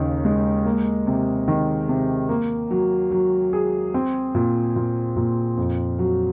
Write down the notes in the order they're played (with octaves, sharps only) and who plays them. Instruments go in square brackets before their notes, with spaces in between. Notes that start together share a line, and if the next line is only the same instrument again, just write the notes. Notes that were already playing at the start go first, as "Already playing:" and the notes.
Already playing: [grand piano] D#2 C#3 D#4
G#3
A#3
C3
D#3
C3
A#3
F#3
F#3
G#4
C4
A#2
A#2
A#2
F2
F#3